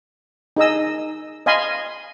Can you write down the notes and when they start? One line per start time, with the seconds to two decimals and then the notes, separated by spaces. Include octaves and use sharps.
0.57 D#4 G#4 D#5 E6
1.46 D#5 F5 G#5 B5 C6